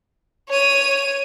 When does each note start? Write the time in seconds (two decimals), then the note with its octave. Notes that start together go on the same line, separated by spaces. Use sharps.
0.49 C#5 D#7